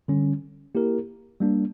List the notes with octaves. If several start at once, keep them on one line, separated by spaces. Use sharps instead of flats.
D3 G3 C#4
A#3 E4 G4 A#4
G3 A#3 D4